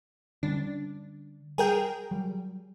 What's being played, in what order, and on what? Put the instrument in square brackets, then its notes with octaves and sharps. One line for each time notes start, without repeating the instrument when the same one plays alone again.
[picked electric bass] D3 G3 C#4 [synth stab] D4
[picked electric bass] G3 [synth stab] G#4 A#4 G5
[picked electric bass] F#3 G3